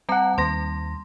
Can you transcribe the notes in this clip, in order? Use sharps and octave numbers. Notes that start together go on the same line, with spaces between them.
G3 C4 F#5 A5 A#5
D#2 G3 C6 A#6